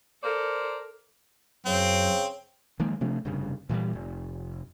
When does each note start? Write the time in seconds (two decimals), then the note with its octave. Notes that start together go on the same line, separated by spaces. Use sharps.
0.23 A4 A#4 C5 D5
1.66 F#2 C#3 C4
2.79 D#3 F3 G#3 A#3
3.01 C3 F3 A3 D4
3.25 F1 G2 C#3
3.69 A#2 E3 F#3 G3
3.93 F1